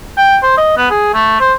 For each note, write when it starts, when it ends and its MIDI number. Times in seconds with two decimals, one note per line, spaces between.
0.17 0.37 79
0.43 0.57 72
0.58 0.76 75
0.77 0.88 59
0.90 1.13 68
1.14 1.39 57
1.40 1.53 72